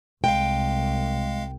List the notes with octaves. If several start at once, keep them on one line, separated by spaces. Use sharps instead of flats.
C2 G#3 F5 G5